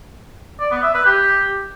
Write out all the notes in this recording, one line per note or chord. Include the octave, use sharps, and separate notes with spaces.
D5
B3
E5
B4
G4